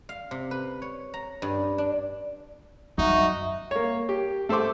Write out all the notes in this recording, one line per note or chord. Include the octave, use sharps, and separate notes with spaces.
F5
C3
B4
C#5
A#5
G2
D4
F#2 D#4 F#4 E5
A#3 C#5
G4
A3 A4 C5 C6 D6